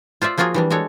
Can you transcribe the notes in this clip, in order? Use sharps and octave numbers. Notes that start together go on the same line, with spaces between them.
F4 C5 D5 E5
F3 A#3 F4 F#4 G#4 A#4
E3 G3 D4
G#3 D4 F#4 A4 C#5